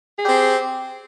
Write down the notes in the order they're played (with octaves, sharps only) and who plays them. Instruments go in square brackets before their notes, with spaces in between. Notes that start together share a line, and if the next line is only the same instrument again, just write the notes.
[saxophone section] G#4
G4
C4